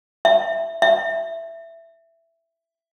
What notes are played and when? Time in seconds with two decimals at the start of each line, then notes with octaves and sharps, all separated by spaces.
0.25 E5
0.82 E5